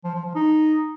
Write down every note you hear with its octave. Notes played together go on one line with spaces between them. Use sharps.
F3
F3
F3
D#4